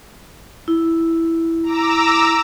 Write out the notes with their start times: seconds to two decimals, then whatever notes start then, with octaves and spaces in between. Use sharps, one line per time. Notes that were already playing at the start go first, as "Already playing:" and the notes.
0.68 E4
1.63 A#5 D6 E6